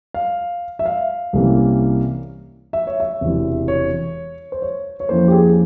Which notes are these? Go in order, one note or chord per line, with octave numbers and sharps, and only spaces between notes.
F5
E5
F5
C2 C3 E3 A#3 C#4
E5
C#5
E5
E1 E2 C3 E3
C#5
C5
C#5
C#5
F2 E3 A#3 C#4 C5
G4
G#4